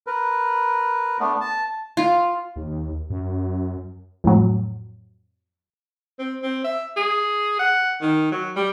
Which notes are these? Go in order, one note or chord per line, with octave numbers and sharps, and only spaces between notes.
A#4 B4
A3 B3 D4
A5
F4
D#2
F#2
F2 A2 F#3
C4
C4
E5
G#4
F#5
D#3
F#3
G3